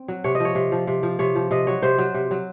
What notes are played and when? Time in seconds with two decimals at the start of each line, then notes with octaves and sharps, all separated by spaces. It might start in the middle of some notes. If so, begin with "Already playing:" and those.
Already playing: C4
0.08 F#3
0.24 C3 C#5
0.35 D#5
0.40 F3 C#5
0.55 C3
0.72 F3
0.87 C3
1.03 F3
1.19 C3 C#5
1.35 F3
1.51 C3 D#5
1.67 F#3 C#5
1.82 C3 C5
1.98 F#3
2.14 C3
2.31 F#3